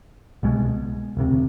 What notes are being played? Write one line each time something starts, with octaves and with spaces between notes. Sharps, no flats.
C2 B2 G#3
E1 D2 C3